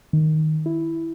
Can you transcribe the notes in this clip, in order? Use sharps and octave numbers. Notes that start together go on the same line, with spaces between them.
D#3
E4